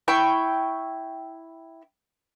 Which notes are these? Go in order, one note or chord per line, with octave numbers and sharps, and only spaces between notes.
E4 G5 C#6